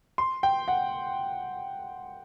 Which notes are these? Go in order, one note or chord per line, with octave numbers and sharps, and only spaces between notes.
C6
G5
F#5